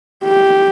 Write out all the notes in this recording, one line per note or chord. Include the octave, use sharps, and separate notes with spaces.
G4